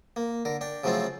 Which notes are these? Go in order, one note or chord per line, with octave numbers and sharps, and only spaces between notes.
A#3
D3 A#4
D4 G5
C#3 F3 F#3 A3 C4 F4